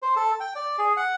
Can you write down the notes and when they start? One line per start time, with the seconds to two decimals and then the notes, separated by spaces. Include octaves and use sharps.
0.02 C5
0.16 A4
0.40 G5
0.56 D5
0.78 G#4
0.97 F#5